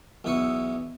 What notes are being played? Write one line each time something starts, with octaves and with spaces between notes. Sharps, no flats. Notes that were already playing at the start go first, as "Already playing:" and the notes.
B1 E2 E4 B4 C#6